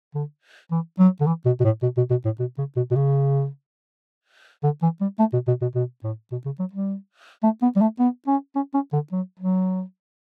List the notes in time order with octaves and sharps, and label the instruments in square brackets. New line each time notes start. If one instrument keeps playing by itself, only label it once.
[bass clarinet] D3
E3
F#3
D3
E3
B2
B2
A2
B2
B2
B2
A2
B2
C#3
B2
B2
C#3
D3
E3
G3
A3
B2
B2
B2
B2
A2
B2
C#3
F#3
G3
A3
B3
G3
A3
B3
C#4
C#4
C#4
D3
F#3
F#3